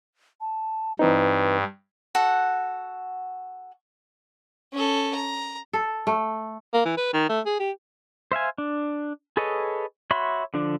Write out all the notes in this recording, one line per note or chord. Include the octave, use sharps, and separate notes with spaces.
A5
G2 E3 C4 D#4 B4
F#4 A4 F#5
C#4 A4
A#5
A4
A3
A#3
E3
B4
D#3
A3
G#4
G4
C5 E5 F5 G#5
D4
G#4 A4 B4 C#5 D#5
F#4 C#5 E5 B5 C6
D3 F3 D4